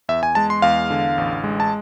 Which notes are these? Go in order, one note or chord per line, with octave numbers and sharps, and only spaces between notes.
E2 E5
G#5
G#3 A5
C6
E2 F5
D3
A1
G#3
A5